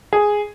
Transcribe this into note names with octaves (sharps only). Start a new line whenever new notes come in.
G#4